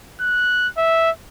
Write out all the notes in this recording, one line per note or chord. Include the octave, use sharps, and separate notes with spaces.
F#6
E5